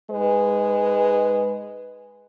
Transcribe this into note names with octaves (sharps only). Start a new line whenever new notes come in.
G#2 G#3 B4